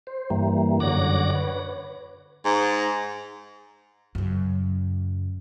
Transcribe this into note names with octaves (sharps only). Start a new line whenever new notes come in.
C5
G2 E3 G3 A#3
F#2 D3 C#5 F#5 D6 A#6
B4 C#5
G#2
F#2 C#3